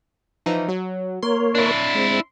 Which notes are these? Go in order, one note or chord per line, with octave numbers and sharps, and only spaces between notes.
E3 F3 D#4
F#3
A#3 A#4 C#5 C6
D4 E4
G#3 C4